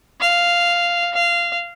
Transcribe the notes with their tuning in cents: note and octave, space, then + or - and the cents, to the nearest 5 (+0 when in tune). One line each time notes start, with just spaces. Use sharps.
F5 -5
F5 -15